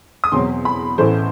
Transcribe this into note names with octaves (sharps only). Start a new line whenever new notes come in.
D#6
E2 B2 F#3 C4 C6
B5
A1 A2 E3 A3 C5